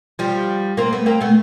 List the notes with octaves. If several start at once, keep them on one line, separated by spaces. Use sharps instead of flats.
F3 G3
A#3 C4
A3 B3
A#3 C4
A3 B3